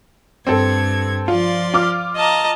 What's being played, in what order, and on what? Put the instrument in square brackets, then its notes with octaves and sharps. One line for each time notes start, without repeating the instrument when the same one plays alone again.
[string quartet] G2 G#6 [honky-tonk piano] C4 A4
[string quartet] F3 D5 C6 [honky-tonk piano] F4
[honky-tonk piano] F4 D6 F6
[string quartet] D#5 A5 A#5